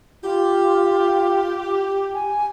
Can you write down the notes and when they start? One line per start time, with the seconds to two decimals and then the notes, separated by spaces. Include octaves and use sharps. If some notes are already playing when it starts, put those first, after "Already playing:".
0.23 F4 G4
2.14 G#5